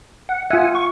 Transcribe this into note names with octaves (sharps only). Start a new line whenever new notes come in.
F#5
F4 E5 F#5 G#5
C#6